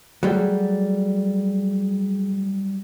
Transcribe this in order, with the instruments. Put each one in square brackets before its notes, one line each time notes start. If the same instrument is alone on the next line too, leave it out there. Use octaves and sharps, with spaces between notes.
[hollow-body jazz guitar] F#3 G3 [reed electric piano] A3 G#4